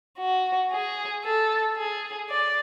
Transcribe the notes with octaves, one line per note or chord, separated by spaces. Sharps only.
F#4
G#4
A4
G#4
D5